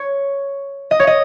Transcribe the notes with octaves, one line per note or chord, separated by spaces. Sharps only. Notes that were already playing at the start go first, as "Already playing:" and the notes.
Already playing: C#5
D#5
C#5
D#5